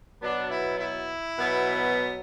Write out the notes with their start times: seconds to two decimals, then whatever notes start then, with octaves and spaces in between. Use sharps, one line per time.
0.21 B2 F#3 B3 D4
0.50 E4
0.79 E4
1.37 B2 F#3 B3